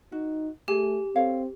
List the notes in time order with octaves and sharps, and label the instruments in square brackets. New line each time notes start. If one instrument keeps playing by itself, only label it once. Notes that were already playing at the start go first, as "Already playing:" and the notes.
[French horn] D#4 [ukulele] F#4
[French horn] A3 [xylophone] G4 [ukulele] G#4 G#5
[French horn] C4 [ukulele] A4 C#5 F5